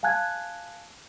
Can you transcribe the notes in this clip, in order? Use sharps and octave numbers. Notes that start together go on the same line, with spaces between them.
F5 G#5 A5 F#6 G#6